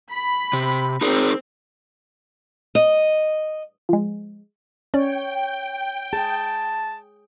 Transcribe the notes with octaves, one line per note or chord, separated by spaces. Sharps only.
B5
C3
C4 D#4 G#4 A#4
D#5
F3 G#3
C#4 C#5 D5 G5
G#4 A5